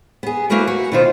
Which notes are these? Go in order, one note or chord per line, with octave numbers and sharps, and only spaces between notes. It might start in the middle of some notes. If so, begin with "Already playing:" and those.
B3 G#4
A3 A#3 E4 F#4 A#4 B4
F#4
B2 D#3 D#4 F4 C5